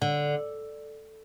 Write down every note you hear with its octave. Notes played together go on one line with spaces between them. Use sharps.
D3